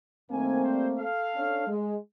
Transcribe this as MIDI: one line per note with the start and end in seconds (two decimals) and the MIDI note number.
0.31 0.63 42
0.31 0.63 51
0.31 1.05 57
0.31 1.05 58
0.31 1.05 60
0.31 0.63 80
0.64 0.86 55
0.64 0.86 72
0.97 1.68 69
0.97 1.68 77
1.35 1.64 61
1.35 1.64 62
1.67 1.95 56